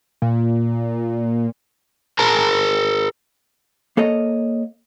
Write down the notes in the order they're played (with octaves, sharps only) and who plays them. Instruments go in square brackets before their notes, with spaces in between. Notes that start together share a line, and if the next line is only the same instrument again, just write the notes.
[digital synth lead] A#2
[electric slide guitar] G#4 A#4 A5 A#5
[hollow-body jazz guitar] A#3 A4 C#5 D#5